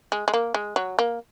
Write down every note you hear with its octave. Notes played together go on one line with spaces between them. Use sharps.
G#3
G#3
A#3
G#3
F#3
A#3